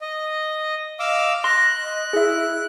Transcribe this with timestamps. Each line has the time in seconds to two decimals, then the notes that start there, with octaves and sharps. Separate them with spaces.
0.01 D#5
0.99 D#5 F5 D6 E6
1.44 C6 F#6 A#6
1.83 D#5
2.13 E4 G#4 E5